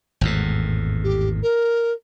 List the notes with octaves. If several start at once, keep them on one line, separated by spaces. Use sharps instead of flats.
G#1 E2 A2
G4
A#4